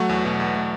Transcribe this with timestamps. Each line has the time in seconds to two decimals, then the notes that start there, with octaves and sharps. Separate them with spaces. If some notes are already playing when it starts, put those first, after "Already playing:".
Already playing: F#3 A3 F#4 F#5
0.09 E2
0.25 B2
0.40 E2
0.55 A3